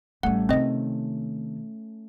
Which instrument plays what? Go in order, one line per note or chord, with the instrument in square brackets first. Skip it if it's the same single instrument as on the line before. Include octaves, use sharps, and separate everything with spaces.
[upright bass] A1 G3 [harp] A3 C#4 [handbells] F#5
[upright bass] C3 D#3 [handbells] C4 D#5